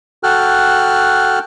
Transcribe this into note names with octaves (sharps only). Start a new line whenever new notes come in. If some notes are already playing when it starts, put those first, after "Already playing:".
F#4 A4 G5 F6 F#6